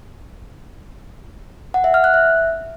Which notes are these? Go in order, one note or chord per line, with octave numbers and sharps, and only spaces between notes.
F#5
E5
F6
F#6
E5